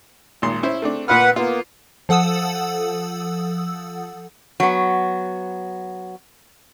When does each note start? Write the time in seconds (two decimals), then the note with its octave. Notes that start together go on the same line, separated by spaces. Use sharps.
0.42 G#1 A#2 C6
0.63 C#4 E4 C5
0.82 A3 C4 D4
1.08 A#2 F4 B4 F#5 F6
1.36 A#3 B3 F4
2.09 F3 A4 F#5 D#6 E6
4.60 F#3 B3